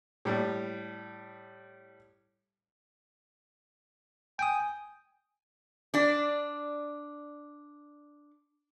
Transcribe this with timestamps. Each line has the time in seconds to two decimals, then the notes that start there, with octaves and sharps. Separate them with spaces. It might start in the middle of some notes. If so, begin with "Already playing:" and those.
0.25 A2 G3
4.39 G5 G#5 D#6
5.94 D4 D5